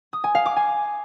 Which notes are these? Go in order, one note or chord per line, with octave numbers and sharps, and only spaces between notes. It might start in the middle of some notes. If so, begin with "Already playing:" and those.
D#6
G#5
F5
D6
G#5